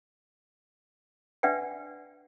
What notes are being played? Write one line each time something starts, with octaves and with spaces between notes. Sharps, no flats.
D4 B4 D5 E5 F#5 G5